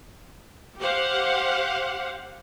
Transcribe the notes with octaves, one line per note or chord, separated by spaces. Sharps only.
G4 C5 F5 F#5